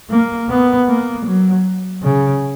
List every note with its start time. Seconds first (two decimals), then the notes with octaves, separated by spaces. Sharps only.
0.10 A#3
0.49 B3
0.88 A#3
1.26 F#3
2.03 C#3